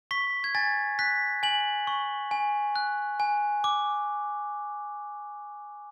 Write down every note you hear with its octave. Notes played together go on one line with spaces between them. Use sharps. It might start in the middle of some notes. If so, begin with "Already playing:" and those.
C#6 B6
G#6
G#5 A6
F#6 B6
G#5 F#7
C#6
G#5
F#6
G#5
D6